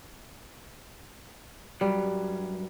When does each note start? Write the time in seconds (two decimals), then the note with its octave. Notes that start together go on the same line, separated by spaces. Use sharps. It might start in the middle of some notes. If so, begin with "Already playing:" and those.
1.81 G2 F#3 G3